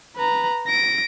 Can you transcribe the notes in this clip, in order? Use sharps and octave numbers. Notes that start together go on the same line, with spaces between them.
B4 A#5
A#6 D7